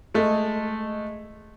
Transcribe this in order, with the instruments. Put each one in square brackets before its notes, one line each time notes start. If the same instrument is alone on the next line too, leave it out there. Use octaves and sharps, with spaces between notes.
[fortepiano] G#3 A3 D#5